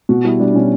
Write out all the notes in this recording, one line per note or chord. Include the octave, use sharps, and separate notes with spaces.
B2 F#4
G3 E4
G3 D4
B2 C#4